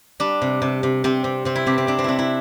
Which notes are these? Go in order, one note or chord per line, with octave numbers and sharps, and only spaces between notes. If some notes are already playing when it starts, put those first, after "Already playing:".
G3 D4
C3
C3
C3
C3 C4
C3
C3 C4
E4
C3 G4
C4
C3 D4
C4
C3 D4 E4
E4